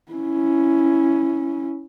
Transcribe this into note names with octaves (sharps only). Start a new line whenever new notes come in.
C#4 E4